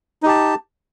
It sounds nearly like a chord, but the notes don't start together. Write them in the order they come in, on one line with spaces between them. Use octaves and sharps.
D#4 G4 A5